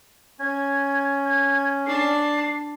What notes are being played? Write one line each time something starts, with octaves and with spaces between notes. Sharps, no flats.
C#4 G#6
G#6
D4 A5 C7